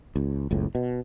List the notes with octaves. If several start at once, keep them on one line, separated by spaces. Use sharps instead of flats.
C#2
F#1 C#2 A2
B2